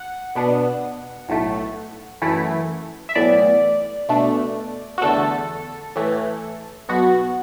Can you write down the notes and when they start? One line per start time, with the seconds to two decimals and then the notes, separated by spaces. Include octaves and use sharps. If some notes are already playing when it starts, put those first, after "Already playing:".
Already playing: F#5
0.36 B2 B3 D4
1.29 B1 A2 A3
2.22 F#2 E3 A3 E4
3.09 E5
3.16 B1 A2 E3 B3 D5
4.09 B2 A3 D4
4.98 F#4
5.02 E2 D3 A3 A4
5.96 A2 E3 A3
6.89 B1 B2 B3 F#4